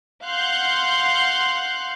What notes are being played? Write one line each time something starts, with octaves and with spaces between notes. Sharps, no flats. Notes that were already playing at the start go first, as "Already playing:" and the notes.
F5 F#5 C6 F#6 G6